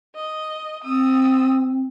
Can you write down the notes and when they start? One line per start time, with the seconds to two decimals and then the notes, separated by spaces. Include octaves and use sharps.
0.16 D#5
0.84 C4 D#6 E6